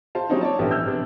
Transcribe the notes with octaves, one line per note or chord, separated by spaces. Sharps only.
F4 C5 F5 A5
F#3 G3 A#3 C4 C#4 D#4
C#5 D5 A5
A#1 E3 B3 G4 A4
E6 F6 G6
C3 B3 D4